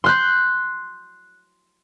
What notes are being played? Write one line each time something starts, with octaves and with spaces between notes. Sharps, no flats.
C6 F#6 G6